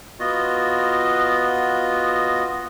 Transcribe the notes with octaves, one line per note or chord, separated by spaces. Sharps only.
B3 F4 F#4 D#5